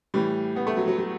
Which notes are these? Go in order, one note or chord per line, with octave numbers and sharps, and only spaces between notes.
A2 E3 G3
B3
A3
F#3
F#3
F#3